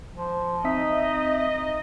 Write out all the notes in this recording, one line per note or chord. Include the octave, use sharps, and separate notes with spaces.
F3
C4 D#4 D#5 E5 B6